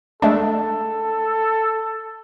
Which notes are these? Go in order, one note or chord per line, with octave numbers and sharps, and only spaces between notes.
G#3 A3 D4 A4